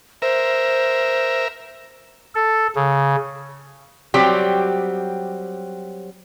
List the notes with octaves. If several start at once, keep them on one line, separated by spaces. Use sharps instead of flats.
A#4 C5 E5
A4
C#3
F#3 G3 C4 G4